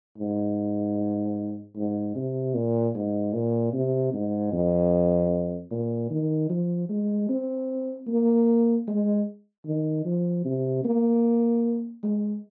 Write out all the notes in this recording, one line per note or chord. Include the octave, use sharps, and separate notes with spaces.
G#2
G#2
C3
A#2
G#2
A#2
C3
G#2
F2
A#2
D#3
F3
G#3
C4
A#3
G#3
D#3
F3
C3
A#3
G#3